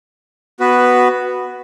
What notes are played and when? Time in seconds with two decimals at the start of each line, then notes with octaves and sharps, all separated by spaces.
0.60 B3 F#4 B4